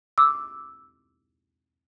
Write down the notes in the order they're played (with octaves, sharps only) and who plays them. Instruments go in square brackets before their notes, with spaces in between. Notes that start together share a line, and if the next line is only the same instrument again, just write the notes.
[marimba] D6 E6